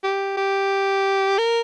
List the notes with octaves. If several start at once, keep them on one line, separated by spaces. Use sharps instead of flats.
G4
G4
A#4